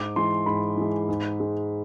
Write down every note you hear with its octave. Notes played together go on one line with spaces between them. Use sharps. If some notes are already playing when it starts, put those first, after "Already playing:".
Already playing: G#2 D6
E3 G#3 C6
G#2 B5
E3 G#3
G#2
G#3